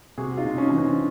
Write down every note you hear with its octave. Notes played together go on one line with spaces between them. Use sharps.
C3 F#4 G#4
D#4 F4
C3
C#4 D#4
E3 C#4
C4 D4